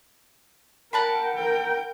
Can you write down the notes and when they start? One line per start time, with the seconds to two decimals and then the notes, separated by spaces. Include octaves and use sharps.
0.93 A#4 F#5 G5 A5 B5
1.34 A#4 G5